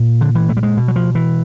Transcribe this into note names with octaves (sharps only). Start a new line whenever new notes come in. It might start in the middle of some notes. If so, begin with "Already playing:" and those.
Already playing: A#2
D3
E3
A3
G3
G#3
B2
F#3
F3
E3